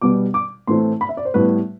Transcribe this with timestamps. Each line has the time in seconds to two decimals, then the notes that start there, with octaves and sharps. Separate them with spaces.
0.01 B2 G3 B3 D6
0.34 D6
0.67 A2 E3 A3 C4 C6
1.01 B5
1.09 E5
1.17 D5
1.25 C5
1.34 A2 G3 B3 B4